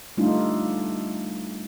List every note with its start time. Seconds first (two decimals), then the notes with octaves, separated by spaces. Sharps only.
0.17 G3 A3 D4 D#4 F4